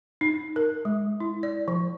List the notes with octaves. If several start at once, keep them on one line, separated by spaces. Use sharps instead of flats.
D#4
A#4
G#3
E4
D5
F3